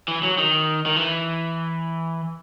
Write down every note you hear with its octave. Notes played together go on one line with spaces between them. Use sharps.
E3
F#3
D#3
D#3
E3